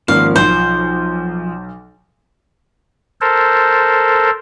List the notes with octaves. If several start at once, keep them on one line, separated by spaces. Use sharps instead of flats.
G#1 F3 A#3 C#4 F5
B1 C5
A4 A#4 C5